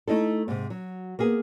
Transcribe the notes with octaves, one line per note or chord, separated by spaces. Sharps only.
A3 D#4 E4 A4
G#2 C3
F#3
A#3 B3 G#4